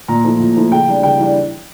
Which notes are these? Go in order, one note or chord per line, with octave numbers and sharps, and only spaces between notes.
A#2 A#5
F3 A3 E4
A#2
F3 A3 E4
C#3 G5
E3 G3 D4
C#3 G5
E3 G3 D4